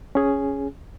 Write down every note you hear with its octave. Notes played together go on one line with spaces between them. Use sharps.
C#4 G#4